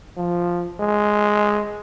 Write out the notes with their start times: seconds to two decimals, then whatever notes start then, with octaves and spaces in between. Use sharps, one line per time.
0.17 F3
0.80 G#3